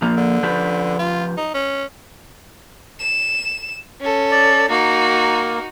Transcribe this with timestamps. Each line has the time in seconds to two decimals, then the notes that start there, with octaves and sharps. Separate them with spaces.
0.02 A#2 F3 A#3
0.17 D3
0.43 F3 G4 B4
0.99 F4
1.37 D#4
1.54 C#4
2.99 E7
4.01 C#4 A4
4.31 D5
4.70 A#3 D#4 F#4